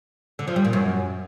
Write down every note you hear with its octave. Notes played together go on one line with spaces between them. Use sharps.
D3
F3
G3
A#2
F#2